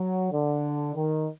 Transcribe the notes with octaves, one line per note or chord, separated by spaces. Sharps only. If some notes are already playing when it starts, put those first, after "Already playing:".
Already playing: F#3
D3
D#3